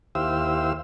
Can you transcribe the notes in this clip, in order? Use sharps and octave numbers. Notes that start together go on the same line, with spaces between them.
D#2 E4 G4 C5 F5 E6